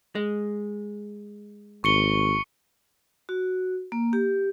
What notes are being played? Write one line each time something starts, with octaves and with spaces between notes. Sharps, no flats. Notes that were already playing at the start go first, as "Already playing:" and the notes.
G#3
G#1 C#6 C#7 G7
F#4
A#3
G4